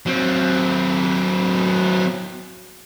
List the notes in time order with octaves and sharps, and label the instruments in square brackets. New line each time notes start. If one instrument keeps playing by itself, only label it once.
[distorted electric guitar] F#3 C4